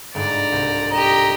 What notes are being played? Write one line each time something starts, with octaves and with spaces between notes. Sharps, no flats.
G1 G#2 D5 A#5
C2
G4 D#5 A#5